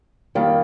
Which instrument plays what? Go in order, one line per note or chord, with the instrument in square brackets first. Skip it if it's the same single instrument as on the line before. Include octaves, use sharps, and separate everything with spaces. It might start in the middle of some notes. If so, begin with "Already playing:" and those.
[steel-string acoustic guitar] F2 D#3 G3 A#3